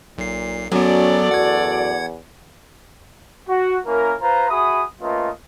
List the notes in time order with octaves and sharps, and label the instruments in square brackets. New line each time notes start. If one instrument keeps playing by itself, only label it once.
[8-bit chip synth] B1 C7 [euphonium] A#2
[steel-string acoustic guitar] F#2 [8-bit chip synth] F#3 B3 [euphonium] C#4 [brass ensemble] F#4 A4 D5
[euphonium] E2 [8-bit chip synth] F#5 G#6
[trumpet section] F#4
A#3 C#4 E4 A#4
F4 B4 C5 A#5
F#4 G#4 E5 B5 D#6
A3 A#3 C#4 F4 B4 D#5